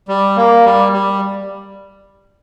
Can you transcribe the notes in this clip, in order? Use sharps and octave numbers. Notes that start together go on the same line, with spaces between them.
G3
A#3
G3
G3